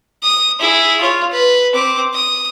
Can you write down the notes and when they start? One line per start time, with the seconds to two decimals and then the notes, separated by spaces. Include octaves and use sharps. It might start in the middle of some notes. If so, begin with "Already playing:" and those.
0.23 D#6
0.60 E4 G#4
1.01 F4 C#5
1.31 B4
1.74 C4 D6
2.14 D#6